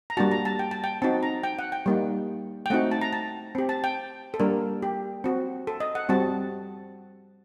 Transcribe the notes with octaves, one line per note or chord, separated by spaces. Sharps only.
A#5
G3 A#3 D4 F#4 A5
A#5
A5
G5
A5
G5
C4 D#4 F#4 A5
A#5
G5
F#5
G5
G3 A#3 D#4
G5
A3 C4 D#4 F#4 F#5
A5
A#5
A5
C4 G4
A5
G5
A4
G3 A#3 D4 A#4
G4
C4 F#4
A4
D#5
F#5
G3 C4 F#4 A5